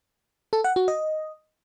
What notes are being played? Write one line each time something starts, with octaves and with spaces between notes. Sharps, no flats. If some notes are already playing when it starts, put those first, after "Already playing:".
A4
F#5
F#4
D#5